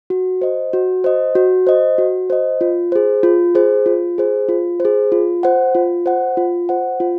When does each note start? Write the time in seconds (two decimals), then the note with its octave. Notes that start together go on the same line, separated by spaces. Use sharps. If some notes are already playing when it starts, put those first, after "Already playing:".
0.10 F#4
0.41 C5 D#5
0.73 F#4
1.04 C5 D#5
1.35 F#4
1.67 C5 D#5
1.98 F#4
2.30 C5 D#5
2.61 F4
2.92 G#4 C5
3.23 F4
3.55 G#4 C5
3.86 F4
4.18 G#4 C5
4.49 F4
4.80 C5
4.85 G#4
5.12 F4
5.43 C5 F#5
5.75 F4
6.06 C5 F#5
6.37 F4
6.69 C5 F#5
7.00 F4